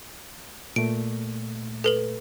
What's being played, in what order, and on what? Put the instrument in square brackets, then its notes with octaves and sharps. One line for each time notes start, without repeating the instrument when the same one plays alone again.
[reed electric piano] A#2 A3 [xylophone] D7
[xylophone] A4 B4 F#7